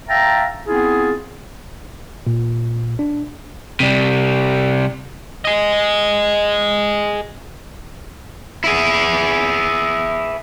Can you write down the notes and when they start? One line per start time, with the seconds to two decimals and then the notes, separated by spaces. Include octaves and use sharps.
0.09 E5 F5 G5 A5 A#5
0.67 B3 C4 E4 F4 G#4
2.27 A#2
2.99 D4
3.80 C3 G3
5.45 G#4 D#5
8.64 E4 G#4